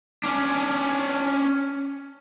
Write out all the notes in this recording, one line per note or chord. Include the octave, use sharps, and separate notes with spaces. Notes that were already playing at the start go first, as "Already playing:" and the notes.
C#4 D4